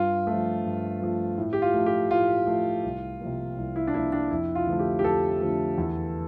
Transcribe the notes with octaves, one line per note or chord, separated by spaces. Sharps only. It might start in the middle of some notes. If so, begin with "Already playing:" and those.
Already playing: G2 F4
F3 A3
G2
F3 A3
A2
G4
F4
F3 A3
G4
A2 F4
F3 A3
C2
C3 F3 A#3
C2
E4
D4
C3 F3 A#3 E4
D4
F2 E4
F4
D3 F3 A3
G4
G4
F2 A4
D3 F3 A3
E2